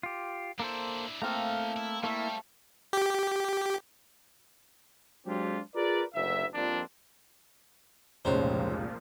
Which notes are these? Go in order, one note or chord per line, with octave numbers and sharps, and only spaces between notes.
F4 G4
A#3 D4 E4 A4 C5
A3 A#3 C4 E4 A4 F5 A#5
E4
G3 A3 A#3 E4 E5
G4
F#3 G#3 C4 D4 F4 G4
F4 G#4 A#4 B4 D5
F#1 D2 E5
F2 F3 G3 A#3 C4 D4
F1 C#2 A#2 F3 G#3 C5 C#5